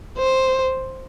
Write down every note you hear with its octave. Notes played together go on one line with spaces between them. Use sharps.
C5